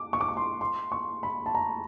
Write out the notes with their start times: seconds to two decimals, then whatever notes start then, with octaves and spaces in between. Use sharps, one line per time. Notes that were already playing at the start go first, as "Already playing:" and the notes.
Already playing: D6
0.13 C#6
0.21 D6
0.29 C#6
0.37 C6
0.61 C6
0.92 C#6
1.23 B5
1.46 A5
1.55 A#5